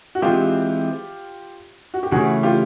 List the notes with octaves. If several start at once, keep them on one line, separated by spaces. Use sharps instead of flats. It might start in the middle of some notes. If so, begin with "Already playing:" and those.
F#4
E3 G#3 C4 F4 G4
F#4
G4
C#3 E3 A3 C#4 F#4 G#4
F4 G4